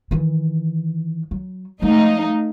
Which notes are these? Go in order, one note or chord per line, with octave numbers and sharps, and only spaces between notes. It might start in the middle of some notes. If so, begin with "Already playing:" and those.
D#3 E3
F#3
F3 G#3 A3 D#4 F5